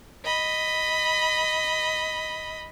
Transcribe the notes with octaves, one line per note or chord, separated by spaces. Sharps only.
D#5 B5